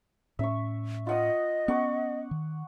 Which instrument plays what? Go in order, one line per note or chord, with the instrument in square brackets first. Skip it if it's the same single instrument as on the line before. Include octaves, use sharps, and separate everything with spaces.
[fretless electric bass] A2 C#4 [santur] E5 C#6
[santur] F4 F#5 D#6 [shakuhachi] D#5
[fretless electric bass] B3 C#4 [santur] F#5 C#6 D6
[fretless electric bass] D#3